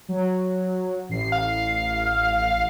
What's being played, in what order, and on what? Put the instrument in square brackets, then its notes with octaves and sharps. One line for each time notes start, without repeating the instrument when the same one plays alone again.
[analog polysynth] F#3
A1 C7
[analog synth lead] F5